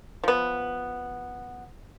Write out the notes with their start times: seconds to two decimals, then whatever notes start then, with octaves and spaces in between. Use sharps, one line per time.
0.24 F3 B3